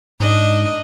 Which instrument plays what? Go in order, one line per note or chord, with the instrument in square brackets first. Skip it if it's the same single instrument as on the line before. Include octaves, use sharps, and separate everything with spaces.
[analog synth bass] G#2 [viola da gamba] D4 D#4 D#5